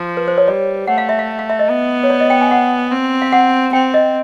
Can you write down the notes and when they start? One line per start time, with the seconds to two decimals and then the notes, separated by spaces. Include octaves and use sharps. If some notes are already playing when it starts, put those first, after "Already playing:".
Already playing: F3
0.17 B4
0.28 C5
0.38 C#5
0.47 G3 D5
0.88 A3 F#5
0.98 F5
1.09 E5
1.19 F5
1.39 F5
1.50 E5
1.59 D#5
1.69 B3
2.04 C#5
2.10 D5
2.20 D#5
2.30 G5
2.41 G#5
2.51 F#5
2.92 C4
3.22 F5
3.32 F#5
3.73 C4 G5
3.94 D#5